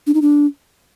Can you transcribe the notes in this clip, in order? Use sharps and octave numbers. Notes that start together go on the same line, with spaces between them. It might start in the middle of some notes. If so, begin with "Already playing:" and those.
D4
D#4
D4